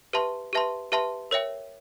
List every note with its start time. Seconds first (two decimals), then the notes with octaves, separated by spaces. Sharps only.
0.13 G4 B4 E5 A5 C6
0.53 G4 B4 E5 A5 C6
0.92 G4 B4 E5 A5 C6
1.31 A#4 C#5 E5 G5